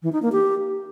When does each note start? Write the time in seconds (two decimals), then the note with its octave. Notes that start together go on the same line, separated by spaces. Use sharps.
0.03 E3
0.13 D#4
0.22 A#3
0.32 G4